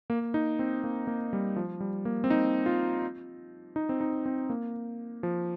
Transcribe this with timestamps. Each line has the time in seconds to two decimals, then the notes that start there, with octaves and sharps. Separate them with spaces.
0.10 A#3
0.34 D#4
0.59 C4
0.84 A#3
1.07 A#3
1.33 G3
1.56 F3
1.80 G3
2.05 A#3
2.24 C4
2.30 D#4
2.66 F4
3.76 D#4
3.89 C4
4.01 D#4
4.26 C4
4.50 A#3
5.23 F3